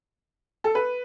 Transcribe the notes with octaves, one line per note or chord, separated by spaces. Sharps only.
A4
B4